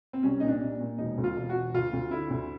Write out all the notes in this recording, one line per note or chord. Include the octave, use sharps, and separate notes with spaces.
C4
C2 C#4
A#2 D#4
D4
A#2
A#2
E1 D#4
D2
F4
E1
F#4
E1
D2 F4
D2
D3 E4
D2